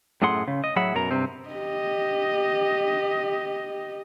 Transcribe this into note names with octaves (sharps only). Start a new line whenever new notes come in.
F#2 A2 A3 G#4 F#5 C6
C#3
D#5
A2 F#3 G#4 E5 F#5 B5
F#2 B2 A#4 A#5
G2 C3 C4
G4 D#5